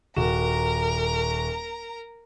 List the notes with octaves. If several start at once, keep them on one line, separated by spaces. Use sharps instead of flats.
D#1 F#4 A#4 A#5 E7